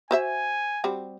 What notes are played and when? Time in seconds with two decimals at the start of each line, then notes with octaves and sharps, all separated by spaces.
0.11 F#4 C5 E5 G#5
0.84 G3 C4 F#4